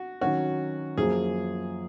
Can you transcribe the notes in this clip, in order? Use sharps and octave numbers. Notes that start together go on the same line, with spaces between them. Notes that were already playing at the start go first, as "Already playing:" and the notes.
Already playing: F#4
D#3 F#3 C#4 F#4
F#2 F3 A#3 G#4